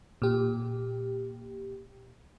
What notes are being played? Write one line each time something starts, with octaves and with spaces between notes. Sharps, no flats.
A#2 G4